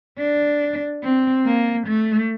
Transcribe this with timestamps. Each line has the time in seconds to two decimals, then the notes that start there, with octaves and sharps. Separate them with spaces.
0.18 D4
1.03 C4
1.45 A#3
1.87 A3